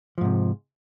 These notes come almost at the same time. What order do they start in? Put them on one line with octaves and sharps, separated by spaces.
F3 G#2 C3